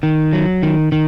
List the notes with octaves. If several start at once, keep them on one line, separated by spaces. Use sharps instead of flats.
D#3
F#3
D#3
D#3